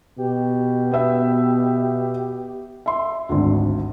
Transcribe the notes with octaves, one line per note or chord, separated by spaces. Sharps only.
B2 G4
B3 E5
E5 C6
G#1 D2